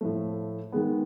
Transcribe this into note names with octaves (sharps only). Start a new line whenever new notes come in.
A2 F3 A3
D#3 G#3 B3